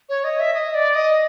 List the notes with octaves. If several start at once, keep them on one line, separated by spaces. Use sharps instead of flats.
C#5
D#5
E5
D#5
D5
D#5